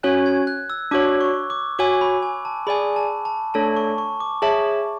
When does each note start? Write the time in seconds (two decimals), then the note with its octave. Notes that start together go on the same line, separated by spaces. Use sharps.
0.03 C#4 F#4 C#5 G#5 F#6
0.26 G#6
0.47 F#6
0.70 E6
0.91 D4 F#4 C#5 D6
1.21 C#6
1.50 D6
1.79 F#4 C#5 G#5 D6
2.01 B5
2.22 G#5
2.45 A5
2.67 G#4 D5 G#5 B5
2.96 A5
3.25 A5
3.54 A3 D4 A4 C#5 A5
3.77 C#6
3.98 C#6
4.20 D6
4.42 G#4 C#5 E5 A5